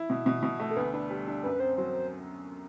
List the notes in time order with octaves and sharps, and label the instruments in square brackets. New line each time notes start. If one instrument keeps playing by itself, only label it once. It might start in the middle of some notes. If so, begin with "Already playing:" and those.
Already playing: [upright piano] E4
B2
B2
B2
A3
[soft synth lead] A4
[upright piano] D2 [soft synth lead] B4
[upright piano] D4 [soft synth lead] B4
[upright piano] G3
D4
[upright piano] F#2 [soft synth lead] B4
[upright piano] C4 [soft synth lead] C5
[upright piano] F#3 [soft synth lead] C5